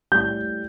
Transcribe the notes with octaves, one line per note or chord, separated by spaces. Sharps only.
A2 G3 G6